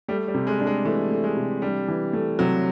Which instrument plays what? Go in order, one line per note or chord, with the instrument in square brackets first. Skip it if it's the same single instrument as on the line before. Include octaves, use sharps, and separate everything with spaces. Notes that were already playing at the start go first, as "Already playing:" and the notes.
[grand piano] G3 [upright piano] A3
[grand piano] G3
[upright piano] C3
[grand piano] G#3
[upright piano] D4
[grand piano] G#3
[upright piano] E3 [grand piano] A3
[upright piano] A3
[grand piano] G#3
[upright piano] C3
[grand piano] G3 [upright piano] D4
[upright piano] E3
A3
[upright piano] C3 [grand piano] F#3